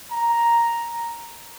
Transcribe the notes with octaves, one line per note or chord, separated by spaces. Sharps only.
A#5